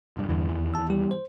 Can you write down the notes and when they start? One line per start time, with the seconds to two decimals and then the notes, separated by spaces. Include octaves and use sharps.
0.17 F1 G2
0.29 E2 G2 D3 E3
0.49 D#2 E3
0.74 A5 E6
0.90 G3 G4
1.11 C5